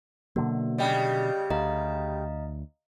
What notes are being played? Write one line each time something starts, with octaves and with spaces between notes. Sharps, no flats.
B2 D3 F#3 A#3
C#3 G3 D5 D#5 G5
D2 D#5 F5 A#5